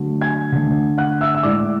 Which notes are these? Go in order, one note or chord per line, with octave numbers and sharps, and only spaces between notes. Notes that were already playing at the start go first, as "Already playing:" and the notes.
Already playing: D3 F#3 A3
G#5 G#6
D3 A3
F#5 F#6
E5 E6
E6
A2 G#3 D5 D6